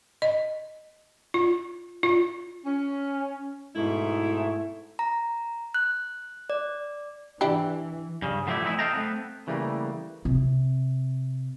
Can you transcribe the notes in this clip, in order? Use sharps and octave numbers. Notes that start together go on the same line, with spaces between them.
D#5
F4
F4
C#4
G#2 B2 A3 E4
A#5
F#6
D5
E3 D4 E4 G4
G2 C#3
D3 F3 G3 A3 E4
E3 A3 C4 D#4 E4
A4 D#5 F5 G5 A5 A#5
A3 B3 C4
C#3 E3 G3 A3 A#3
C3